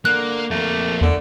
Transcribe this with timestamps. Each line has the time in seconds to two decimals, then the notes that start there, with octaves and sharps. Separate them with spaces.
0.05 D3 A#3 F#6
0.51 F2 A3 A#3
1.01 E2 D3